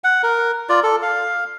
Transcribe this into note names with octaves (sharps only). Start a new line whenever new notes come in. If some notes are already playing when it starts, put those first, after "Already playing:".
F#5
A#4
F4 D5
A4
F5